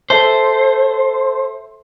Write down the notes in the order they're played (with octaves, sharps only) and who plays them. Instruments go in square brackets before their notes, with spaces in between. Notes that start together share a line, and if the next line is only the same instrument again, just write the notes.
[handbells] A4 E5 A5 [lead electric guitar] C5